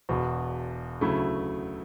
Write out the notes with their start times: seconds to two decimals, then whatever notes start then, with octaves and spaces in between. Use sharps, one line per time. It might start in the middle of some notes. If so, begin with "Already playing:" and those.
0.09 E1 E2 B2
1.01 D2 C#3 F#3 A3 E4